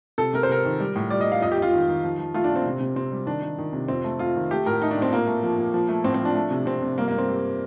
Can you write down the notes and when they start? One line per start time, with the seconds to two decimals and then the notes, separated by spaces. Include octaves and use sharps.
0.18 C3 A4
0.34 C3 A#4
0.43 C5
0.49 C3 A#4
0.65 D#3
0.80 G3
0.96 A2
1.10 G3 D5
1.21 D#5
1.27 G3 F5
1.42 F2 D#5
1.52 G4
1.58 F2 F4
1.73 D#3
1.88 D#3
2.04 F3
2.19 F3
2.34 A3 F4
2.44 D4
2.50 A#2
2.56 C4
2.66 C3
2.81 C3
2.96 C3 C4
3.12 G3
3.26 D#3 D4
3.42 D#3
3.58 D#3
3.73 C3
3.88 F2 C4
4.04 A3
4.19 F2 F4
4.36 D#3
4.51 A3 G4
4.66 A2 A#4
4.82 A3 D#4
4.91 D4
4.97 A2 C4
5.12 A#2 A#3
5.27 A3
5.43 F3
5.58 A#2
5.74 F3
5.89 A3
6.04 A2 C4
6.14 C4
6.20 F3
6.25 D4
6.35 A3
6.51 C3
6.66 C3 C4
6.82 C3
6.98 G2 A#3
7.08 G2 A#3
7.18 C4
7.28 G3